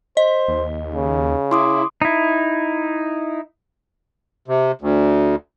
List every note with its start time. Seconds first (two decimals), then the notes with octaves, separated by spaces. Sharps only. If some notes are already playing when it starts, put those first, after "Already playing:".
0.17 C5 D#5
0.48 D#2
0.95 C#3
1.51 E4 C6 D6 D#6
2.02 D#4 E4
4.48 C3
4.82 D2